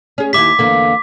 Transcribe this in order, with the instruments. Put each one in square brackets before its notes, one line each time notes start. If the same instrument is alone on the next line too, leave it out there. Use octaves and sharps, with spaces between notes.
[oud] C#4 G#4
[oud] D#2 E4 G4 [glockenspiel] D6 B6
[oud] E2 D3 A#3